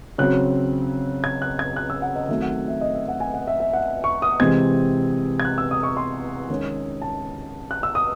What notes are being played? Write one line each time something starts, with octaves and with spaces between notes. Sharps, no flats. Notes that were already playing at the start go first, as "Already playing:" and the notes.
C#3 F#3 C4 F#6
G#6
F#6
G#6
F#6
E6
F#5
D#5
D#3 F#3 A3 C4 E5
F#5
E5
D#5
E5
F#5
G#5
F#5
E5
E5
F#5
C#6
D#6
C3 E3 G#3 C4 G#6
G#6
F#6
E6
D#6
C#6
C6
D#3 G#3 C#4
A5
F#6
E6
D#6